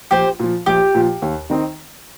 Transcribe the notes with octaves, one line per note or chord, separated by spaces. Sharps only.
A#1 G4 C5
A#2 F3
A#1 G4
A#2 F3
D#2
D#3 C4 D#4